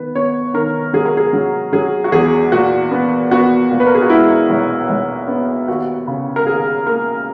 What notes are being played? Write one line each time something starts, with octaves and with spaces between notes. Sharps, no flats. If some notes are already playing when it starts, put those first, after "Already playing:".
Already playing: D#3 B3 B4
B3 C#5
D#3 A#4
F#3 G#4
A#4
G#4
F#3
F#3 G#4
F#4
E2 G#4
A#2 F#4
B3
B3 F#4
A#2
B4
A#4
G#4
F#4
G#3 E4
B1
B1
B3
D#2 F#4
C#3
A#4
D#2 G#4
A#3 A#4